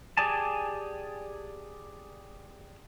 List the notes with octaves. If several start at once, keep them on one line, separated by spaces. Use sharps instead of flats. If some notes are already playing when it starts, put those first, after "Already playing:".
G4 G#4 D5 G#5 A5